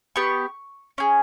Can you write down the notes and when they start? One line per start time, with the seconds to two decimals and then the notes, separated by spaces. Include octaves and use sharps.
0.16 B3 G4 C#6
0.98 C#4 G#4